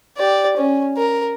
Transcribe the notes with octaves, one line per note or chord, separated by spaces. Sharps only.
G4 D5
C#4
A#4